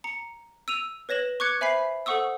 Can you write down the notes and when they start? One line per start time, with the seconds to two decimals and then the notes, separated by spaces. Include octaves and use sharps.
0.04 A#5 C#7
0.68 E6 D#7 F7
1.09 B4 C#5 A#6 E7 F#7
1.40 C#6 D6 F#6 G#6 C#7
1.61 C5 E5 G#5 B5 B6 C7
2.06 A4 C5 F#5 C#6 D#6 E6